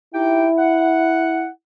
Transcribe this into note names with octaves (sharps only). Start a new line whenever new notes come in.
D#4 E4 G4 G5
F#5